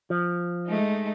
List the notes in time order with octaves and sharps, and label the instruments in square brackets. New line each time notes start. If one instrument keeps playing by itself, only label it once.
[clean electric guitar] F3
[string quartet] G#3 A3 D#4